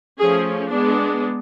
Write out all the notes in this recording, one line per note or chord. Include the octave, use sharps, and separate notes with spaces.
F3 A3 C#4 G#4
G#3 B3 D4